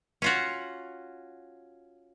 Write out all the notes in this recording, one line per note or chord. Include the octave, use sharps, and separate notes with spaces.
C#4 F4 F#4